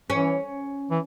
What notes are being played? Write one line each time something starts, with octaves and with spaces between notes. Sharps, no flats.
E3 C#4
E3